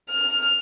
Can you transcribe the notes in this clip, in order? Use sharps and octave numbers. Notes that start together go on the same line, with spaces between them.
F6